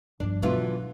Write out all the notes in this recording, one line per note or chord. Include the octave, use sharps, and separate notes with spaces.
G1 F3 D4
B2 D3 E3 F#3 D4 F4